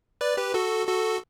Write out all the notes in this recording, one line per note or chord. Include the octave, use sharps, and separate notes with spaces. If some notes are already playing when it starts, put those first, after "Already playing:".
B4 D5
G4 B4
F#4 A4
F#4 A4